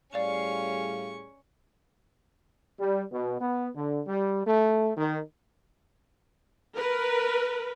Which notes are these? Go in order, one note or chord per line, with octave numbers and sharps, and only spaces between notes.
A2 G3 C#4 G#4 D5 F5 C#6
G3
B2
B3
D3
G3
A3
D#3
A#4 B4